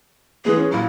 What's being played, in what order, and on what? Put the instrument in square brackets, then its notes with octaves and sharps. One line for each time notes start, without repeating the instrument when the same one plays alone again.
[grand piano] E3 G#3 B3 [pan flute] G#4
[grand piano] C#4
[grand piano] A#2 F#3 [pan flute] E4